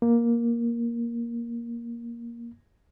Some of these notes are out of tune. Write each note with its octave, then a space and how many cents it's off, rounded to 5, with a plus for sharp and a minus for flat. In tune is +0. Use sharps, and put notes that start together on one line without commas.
A#3 +10